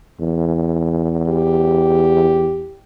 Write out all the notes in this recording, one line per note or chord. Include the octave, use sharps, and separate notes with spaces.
E2
G4